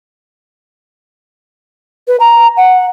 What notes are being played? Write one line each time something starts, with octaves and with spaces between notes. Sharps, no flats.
B4
A#5
F#5